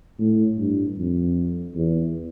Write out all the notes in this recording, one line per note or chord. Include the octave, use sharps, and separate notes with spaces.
A2
G2
F2
E2